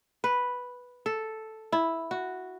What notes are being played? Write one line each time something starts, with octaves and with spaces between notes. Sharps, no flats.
B4
A4
E4
F#4